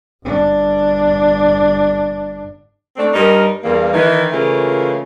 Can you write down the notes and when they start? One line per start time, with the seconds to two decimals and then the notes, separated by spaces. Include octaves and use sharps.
0.24 G1 D4
2.97 A3 C4 D4
3.14 G2 D#4 A#4
3.64 E2 G2 A#3
3.93 D#3 E3
4.32 C#3 E3 A3 A#3 F4